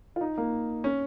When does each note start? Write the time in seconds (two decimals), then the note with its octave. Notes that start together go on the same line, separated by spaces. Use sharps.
0.16 F4
0.21 D#4
0.38 A#3
0.84 C#4